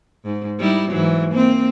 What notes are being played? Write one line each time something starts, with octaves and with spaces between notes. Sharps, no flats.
G#2
G3 D#4 E4
G#2 E3 F#3
A#3 C4